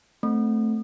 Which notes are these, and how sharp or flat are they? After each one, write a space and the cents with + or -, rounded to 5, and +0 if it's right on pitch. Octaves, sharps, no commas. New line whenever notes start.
A3 +0 C4 +0